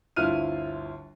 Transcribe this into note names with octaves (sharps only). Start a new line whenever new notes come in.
G1 D2 E4 F4 F6 D#7